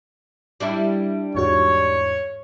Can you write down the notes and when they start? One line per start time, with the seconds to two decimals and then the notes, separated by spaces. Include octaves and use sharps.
0.60 G3 D4 E4
1.35 E2 G#2 F#4 C#5